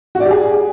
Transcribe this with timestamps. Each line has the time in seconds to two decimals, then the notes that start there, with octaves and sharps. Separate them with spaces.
0.15 F#4
0.20 D5
0.25 G4
0.31 G#4